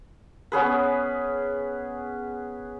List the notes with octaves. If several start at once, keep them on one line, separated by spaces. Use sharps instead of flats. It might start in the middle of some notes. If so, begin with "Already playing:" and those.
B3 C#4 G#4 B4